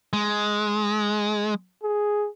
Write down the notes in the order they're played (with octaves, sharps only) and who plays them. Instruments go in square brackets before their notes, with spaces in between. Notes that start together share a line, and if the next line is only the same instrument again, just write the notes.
[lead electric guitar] G#3
[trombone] G#4